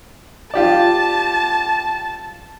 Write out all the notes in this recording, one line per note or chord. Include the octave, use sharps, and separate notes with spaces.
F4 G4 D5 A5